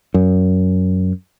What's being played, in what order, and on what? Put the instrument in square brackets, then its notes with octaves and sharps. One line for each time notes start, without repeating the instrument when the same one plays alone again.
[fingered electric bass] F#2